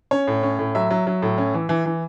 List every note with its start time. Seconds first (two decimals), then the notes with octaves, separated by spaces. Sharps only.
0.11 C#4 C#5
0.28 A2
0.43 C#4
0.59 A2
0.75 F#3 E5
0.90 F#3
1.07 F#3
1.22 A2
1.38 C#4
1.54 E3
1.69 E3
1.86 E3